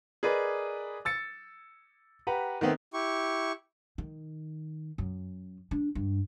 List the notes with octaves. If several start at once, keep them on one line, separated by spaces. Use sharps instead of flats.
G#4 A#4 B4 D5 D#5
E6 A6 C#7
G4 B4 F#5 A#5
D#3 A3 B3 C4
E4 G4 C#6
D#3
F#2
D4
G2